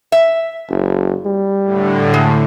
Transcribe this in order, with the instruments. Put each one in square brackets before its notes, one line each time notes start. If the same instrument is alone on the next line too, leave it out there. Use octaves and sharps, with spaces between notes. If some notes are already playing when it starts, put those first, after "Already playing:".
[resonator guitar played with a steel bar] E5
[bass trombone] F#1
G3
[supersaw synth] A2 D3
[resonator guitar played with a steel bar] G#3